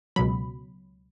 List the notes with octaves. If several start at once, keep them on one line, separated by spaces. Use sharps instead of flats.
C#2 B2 F#3 B5